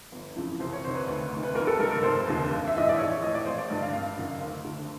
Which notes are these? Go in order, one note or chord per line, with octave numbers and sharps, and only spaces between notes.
G1
F2 C#3 E3
C2 C5
C#5
C3 D#3 C5
B4
D2
C3
D#3
B4
G1 A#4
A4
G2 D#3 A#4
A#4
F1 C5
D#2 D3
G#1
E5
G#2 E3 D#5
D5
A#1 C#5
C#5
A2 E3 D#5
D5
G#1 C5
D5
G2 D3 D#5
F5
G#1 F5
F#2 D#3
D2
D3